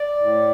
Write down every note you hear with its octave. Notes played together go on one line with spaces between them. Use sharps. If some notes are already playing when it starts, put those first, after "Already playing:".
Already playing: D5
A2